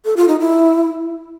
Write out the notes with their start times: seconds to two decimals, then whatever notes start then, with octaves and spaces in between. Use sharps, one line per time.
0.05 A4
0.17 F4
0.28 D#4
0.40 E4